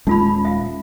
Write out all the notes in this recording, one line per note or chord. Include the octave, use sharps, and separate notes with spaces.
D#1 G#3 C#4 D#4 F4 B5
E5 F5